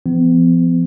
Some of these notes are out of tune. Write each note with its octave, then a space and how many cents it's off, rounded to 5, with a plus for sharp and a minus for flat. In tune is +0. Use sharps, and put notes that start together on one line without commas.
F3 -30 B3 +45